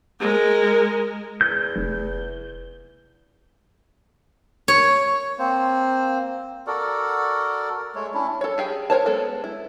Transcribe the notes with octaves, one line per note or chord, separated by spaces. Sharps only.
G#3 A#4
E2 G6
F1
C#5
A#3 C4 C5
F#4 A4 A#4 D5
G#3 A3 C#5
C#4 D4 E4
A4 C#5
G4 G#4 G5
A#4 C5 C#5 A5
G#3 B3 A4
E4